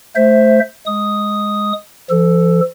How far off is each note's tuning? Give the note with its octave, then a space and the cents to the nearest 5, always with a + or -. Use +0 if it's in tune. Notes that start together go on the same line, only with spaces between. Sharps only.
A3 -15 C5 +0 E5 +5
G#3 +5 D#6 +0
F3 -35 A4 +5